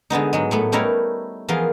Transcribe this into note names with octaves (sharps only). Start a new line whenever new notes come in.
D3 G#3 B3 D#4
G#2 F#3 G#3
A2 A3 B3
G3 A3 D#4 E4 A#4 C#5
E3 F3 B3 G#4 A#4